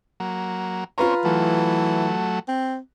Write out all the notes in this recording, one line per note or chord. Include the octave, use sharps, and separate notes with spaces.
F#3 A#3
C4 C#4 F4 B4 A#5
E3 F#3 A3
C4